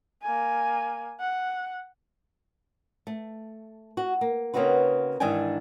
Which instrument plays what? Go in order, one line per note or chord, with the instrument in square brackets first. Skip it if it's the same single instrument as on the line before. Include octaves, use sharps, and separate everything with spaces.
[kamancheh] A#3 G#5
F#5
[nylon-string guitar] A3
F#4
A#3
C#3 A#3 C4 D#4 F#4 B4
G#2 D#3 E3 D4 G5 G#5